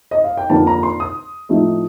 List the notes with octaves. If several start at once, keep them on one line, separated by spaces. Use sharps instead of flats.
D#5
F5
G5
F2 D3 F3 A#3 A5
A#5
C6
D#6
A2 F3 A3 C4 D#4